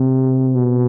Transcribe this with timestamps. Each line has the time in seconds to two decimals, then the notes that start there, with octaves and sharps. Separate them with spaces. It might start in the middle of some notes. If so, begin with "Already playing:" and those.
Already playing: C3
0.55 B2